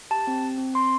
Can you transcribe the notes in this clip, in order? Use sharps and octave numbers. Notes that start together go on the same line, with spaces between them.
G4 A5
C4
C4
C4
C4 C6